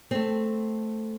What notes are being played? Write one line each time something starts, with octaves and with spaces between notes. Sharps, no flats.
A3 C4